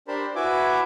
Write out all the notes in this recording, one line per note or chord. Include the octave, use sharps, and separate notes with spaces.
D4 G4 A#4 C5 A5 B5
E4 F#4 B4 E5 G#5 D6